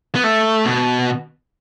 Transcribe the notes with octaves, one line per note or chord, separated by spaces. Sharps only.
B3
A3
B2